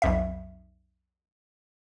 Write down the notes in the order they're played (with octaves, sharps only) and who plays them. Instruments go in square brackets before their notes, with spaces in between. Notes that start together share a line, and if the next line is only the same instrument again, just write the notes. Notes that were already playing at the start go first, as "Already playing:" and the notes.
[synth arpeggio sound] B1 F2 E5